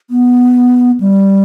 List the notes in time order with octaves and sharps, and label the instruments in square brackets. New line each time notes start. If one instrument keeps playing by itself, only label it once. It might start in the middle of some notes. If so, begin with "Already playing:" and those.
[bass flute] B3
G3